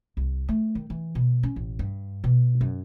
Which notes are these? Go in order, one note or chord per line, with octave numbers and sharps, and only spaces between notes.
C2
A3
D#3
E3
B2
C#4
A1
G2
B2
F#2